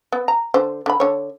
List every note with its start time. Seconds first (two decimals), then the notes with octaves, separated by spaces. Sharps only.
0.12 B3
0.28 A#5
0.54 D3 C5
0.86 D3 B5
1.00 D3 C#5